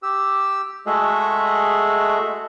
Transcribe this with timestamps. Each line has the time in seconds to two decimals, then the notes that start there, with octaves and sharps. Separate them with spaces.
0.03 G4 E6
0.86 G#3 A3 F#4 G#4 D#5 E5